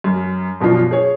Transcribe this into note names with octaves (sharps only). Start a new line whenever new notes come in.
F#2
F#2 B2 F3 D4 F4
G#4 C#5